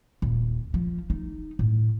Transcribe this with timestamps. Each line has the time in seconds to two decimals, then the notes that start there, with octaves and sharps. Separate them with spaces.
0.22 D#1
0.74 F3
1.10 D#4
1.59 A2